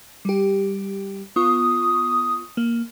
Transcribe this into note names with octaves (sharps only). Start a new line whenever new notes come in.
G3 G4
B3 F4 C#6 D#6
A#3